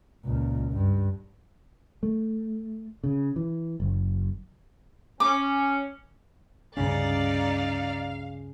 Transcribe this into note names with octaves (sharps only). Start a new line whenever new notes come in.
C#2 A#2
G2
A3
C#3
E3
F#1
C#4 D6
C#2 G2 C#3 C#4 D#4 D5 F5